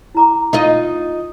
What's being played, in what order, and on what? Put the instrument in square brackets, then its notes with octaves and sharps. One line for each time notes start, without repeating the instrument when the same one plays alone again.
[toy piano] E4 A#5 D6
[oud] D#4 F4 D#5